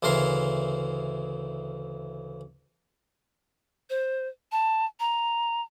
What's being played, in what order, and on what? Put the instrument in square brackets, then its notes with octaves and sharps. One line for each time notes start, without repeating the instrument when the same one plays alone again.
[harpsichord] D2 C#3 E3 A#4 C6
[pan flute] C5
A5
A#5